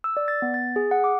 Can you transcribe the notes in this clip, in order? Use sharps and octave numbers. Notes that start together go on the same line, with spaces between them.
E6
D5
A6
B3
A6
G#4
F#5
D6